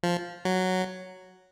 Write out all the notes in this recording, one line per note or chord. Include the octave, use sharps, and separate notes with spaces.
F3
F#3